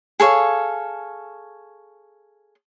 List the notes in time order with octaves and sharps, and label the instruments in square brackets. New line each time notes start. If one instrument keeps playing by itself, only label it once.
[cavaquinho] G#4 A4 C#5 F5